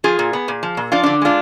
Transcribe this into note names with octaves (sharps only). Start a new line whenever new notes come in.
F3 F4 G#4
A#2
B3
A#2
F3
A#2
F3 D4 F4
D3 D4
G#3 D4 F4